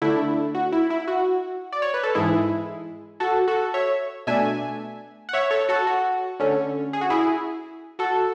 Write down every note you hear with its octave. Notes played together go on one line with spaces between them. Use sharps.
D3 A3 D4 E4
F#4
E4
E4
F#4
D5
C#5
B4
A4
G#2 E3 G#3 E4 G#4
F#4 A4
F#4 A4
C#5 E5
B2 A3 D4 E5 G#5
F#5
C#5 E5
A4 C#5
F#4 A4
F#4
D3 A3 C#4
G#4
F#4
E4 G#4
F#4 A4